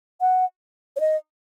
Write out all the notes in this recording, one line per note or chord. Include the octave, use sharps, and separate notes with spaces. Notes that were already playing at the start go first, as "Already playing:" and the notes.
F#5
C#5
D#5